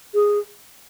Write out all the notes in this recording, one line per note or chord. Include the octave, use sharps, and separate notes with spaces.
G#4